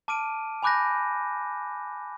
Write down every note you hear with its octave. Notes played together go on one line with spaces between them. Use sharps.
A5 D6 F6 D7 D#7
G#5 B5 D6 F#6 G6 A#6